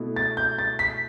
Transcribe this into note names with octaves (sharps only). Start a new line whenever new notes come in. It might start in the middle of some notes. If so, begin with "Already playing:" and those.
Already playing: B2 A3 E4
A6
G6
A6
B6